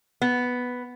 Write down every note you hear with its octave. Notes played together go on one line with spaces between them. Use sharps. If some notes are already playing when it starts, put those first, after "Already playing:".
B3